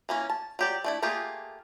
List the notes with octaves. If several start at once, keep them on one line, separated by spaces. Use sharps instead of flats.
E3 A#3 C#4
A5
F#3 G4 D5
A3 D4 E4
A3 A#3 F4 G4 G#4